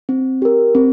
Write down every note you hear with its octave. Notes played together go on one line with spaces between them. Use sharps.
C4
G4 A#4
C4